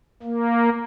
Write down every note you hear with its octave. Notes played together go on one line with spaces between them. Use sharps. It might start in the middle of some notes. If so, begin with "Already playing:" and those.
A#3